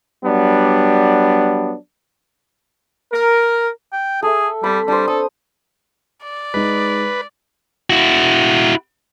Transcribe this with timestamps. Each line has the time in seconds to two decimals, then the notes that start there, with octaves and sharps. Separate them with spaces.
0.24 F#3 G3 B3 D4
3.12 A#4
3.93 G5
4.22 G#4 A4 E5
4.64 G3 C4 B5
4.88 G3 D4 C5
5.08 A4 D#6
6.23 D5
6.54 G#3 D#4 B4
7.90 E4 F#4